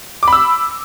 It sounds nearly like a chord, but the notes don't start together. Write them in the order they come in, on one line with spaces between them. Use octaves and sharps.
D6 B5 E6